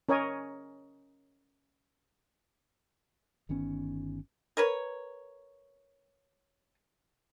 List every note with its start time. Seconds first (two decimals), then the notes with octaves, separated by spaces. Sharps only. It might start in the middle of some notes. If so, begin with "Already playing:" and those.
0.09 C#4 A#4 C#5 D#5 G#5
3.49 G1 D#3 B3 C#4
4.57 A#4 B4 C#5